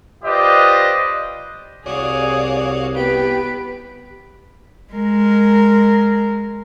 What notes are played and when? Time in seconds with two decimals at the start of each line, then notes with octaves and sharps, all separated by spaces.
0.24 F4 G4 B4 C5 D5 D#5
1.86 C2 F#4 G#4 C#5 D5 F5
2.97 B3 G4 B4 D7
4.93 G#3 A#4